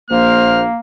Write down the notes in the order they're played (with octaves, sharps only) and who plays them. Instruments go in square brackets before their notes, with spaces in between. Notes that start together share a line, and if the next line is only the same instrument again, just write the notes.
[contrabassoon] A#1 [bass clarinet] A#3 [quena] C5 [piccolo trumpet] F6